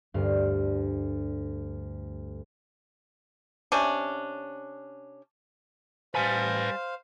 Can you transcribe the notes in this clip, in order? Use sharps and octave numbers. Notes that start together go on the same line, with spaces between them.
D2 G2 F5
C3 C#4 D4
G3 B4 C5 F5 G#5 A5